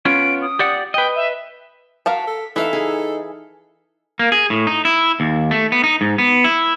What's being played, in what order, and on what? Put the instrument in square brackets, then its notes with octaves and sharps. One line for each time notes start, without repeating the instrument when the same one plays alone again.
[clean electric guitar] B3 C#4 F4 [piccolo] D7
[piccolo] D#6
[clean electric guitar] G4 D5 F#5
[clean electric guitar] B4 D#5 [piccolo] G5
[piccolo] E5
[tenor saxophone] F#4 [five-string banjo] A#4 F5 A5 [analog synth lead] B6
[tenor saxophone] A4
[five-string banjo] E3 [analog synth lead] D#4 [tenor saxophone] A4 [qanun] E5 F5
[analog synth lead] D#4 [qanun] G#4
[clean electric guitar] A#3
G#4
A2
D#4
E4
D#2
A3
B3
D#4
G#2
B3
E4